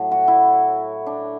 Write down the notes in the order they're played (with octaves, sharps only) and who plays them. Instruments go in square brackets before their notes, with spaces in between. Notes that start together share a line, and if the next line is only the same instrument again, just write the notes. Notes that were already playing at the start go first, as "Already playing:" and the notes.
Already playing: [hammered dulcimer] A2 F#3 A3
F#4
E4
D4